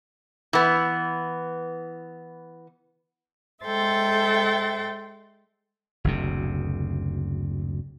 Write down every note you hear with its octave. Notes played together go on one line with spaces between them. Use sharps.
E3 B3
G#3 A4 C5 E5 G5 A6
F#1 D2 C3